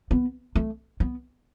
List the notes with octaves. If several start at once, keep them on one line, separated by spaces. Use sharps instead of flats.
B3
A3
B3